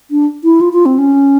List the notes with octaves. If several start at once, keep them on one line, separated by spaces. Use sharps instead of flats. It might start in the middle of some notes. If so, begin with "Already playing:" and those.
D4
E4
F4
F4
C4
C#4